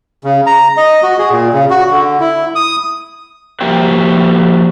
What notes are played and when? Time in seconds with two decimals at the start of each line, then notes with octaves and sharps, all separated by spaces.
0.24 C#3
0.46 A#5
0.77 D#5
1.03 F#4
1.18 G#4
1.30 A#2
1.53 C#3
1.70 F#4
1.91 D3
2.20 E4
2.55 D#6
3.61 F3 A#3 E4 F#4 G4